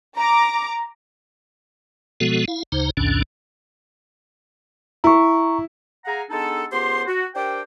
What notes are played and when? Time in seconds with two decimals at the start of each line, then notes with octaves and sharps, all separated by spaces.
0.17 A#5 D6
2.20 B2 F3 G#3 B3 F#4 A4
2.48 E4 F5
2.72 D2 C#3 D#4 C5 A#5
2.97 B1 E2 A2 D3 C#4 D4
5.04 E4 A#5 C#6
6.05 G#4 F5 F#5 G#5 A#5
6.29 G#3 B3 D4 D#4 A4
6.71 C#2 B3 G4 C5 C6
7.06 F#4
7.35 D4 G4 A#4 C5 D5 G5